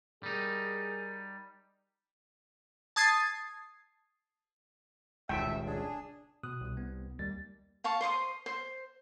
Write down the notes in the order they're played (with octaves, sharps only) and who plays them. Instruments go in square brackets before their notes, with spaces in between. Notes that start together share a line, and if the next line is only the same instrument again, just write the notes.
[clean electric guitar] G3 D#4 [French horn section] G#4 A#4
[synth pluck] A5 D#6 G#6 A6 C7
[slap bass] D#1 C#2 [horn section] D4 E4 E5 [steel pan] G5
[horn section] D4 G#4
[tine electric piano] B2 D#6 F#6
[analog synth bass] C2
[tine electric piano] B3
[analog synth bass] D#2 [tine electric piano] G3 A6
[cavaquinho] F5 A5 C#6
C5 C6 C#6 D#6
C5